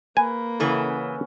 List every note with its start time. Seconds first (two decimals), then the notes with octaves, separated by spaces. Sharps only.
0.17 A#3 B4 G#5
0.60 C#3 E3 C#4 A4 F#5